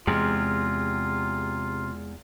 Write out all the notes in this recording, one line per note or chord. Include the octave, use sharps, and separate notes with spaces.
E2 C3 G#3 F4